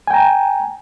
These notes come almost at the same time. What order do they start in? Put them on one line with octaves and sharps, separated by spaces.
G#5 G5 A#5